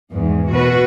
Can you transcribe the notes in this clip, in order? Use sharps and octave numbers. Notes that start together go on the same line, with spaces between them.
E2 G#2
B2 F#4 B4